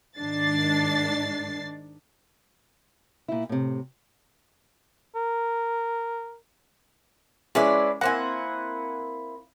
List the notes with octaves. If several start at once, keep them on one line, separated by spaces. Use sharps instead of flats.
G#2 D#3 D4 A6 C7
A#2 E4
A2 C3
A#4
G#3 C#4 D4 E4 B4 D5
A#3 C4 E4 F#5 G#5